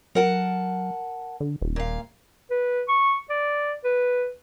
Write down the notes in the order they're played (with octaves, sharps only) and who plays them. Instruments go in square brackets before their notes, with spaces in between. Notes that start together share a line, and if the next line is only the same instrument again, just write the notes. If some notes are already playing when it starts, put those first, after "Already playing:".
[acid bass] F#3 [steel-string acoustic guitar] A#4 F#5 A5
[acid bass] D3
D#1
[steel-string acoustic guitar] A#2 F5
[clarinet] B4
C#6
D5
B4